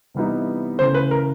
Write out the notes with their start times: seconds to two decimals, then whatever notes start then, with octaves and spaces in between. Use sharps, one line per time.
0.14 C3 E3 G3 B3 D#4
0.79 C#3 E3 A3 C5
0.94 B4
1.11 A#4